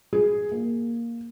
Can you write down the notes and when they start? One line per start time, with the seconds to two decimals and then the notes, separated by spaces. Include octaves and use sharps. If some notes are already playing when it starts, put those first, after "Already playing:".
0.13 G#4
0.52 A#3